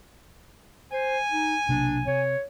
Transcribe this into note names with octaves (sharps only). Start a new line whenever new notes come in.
C5 G#5
D#4
B1 C3 A#3 D4
C3 C#5